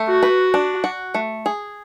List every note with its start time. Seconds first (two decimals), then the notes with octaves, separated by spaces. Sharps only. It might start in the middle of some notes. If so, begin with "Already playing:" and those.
Already playing: A3
0.08 F#4
0.23 B4
0.54 D4
0.84 F#4
1.15 A3
1.46 G#4